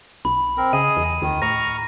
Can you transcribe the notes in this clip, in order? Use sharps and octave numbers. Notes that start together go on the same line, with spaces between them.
B1 B5
C4 A#4
C#3 G#4 D#5 D#7
E2
D2 D#3
A2 A#5 C#6 F6 A#6